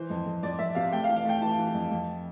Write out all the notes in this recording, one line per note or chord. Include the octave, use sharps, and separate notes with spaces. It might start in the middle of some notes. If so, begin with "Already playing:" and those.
Already playing: E3 C5
F2
F2
F2 D5
F2 E5
C3 F5
A3 G5
F5
E3
F5
A3 G5
E3 A5
E3
F2
F2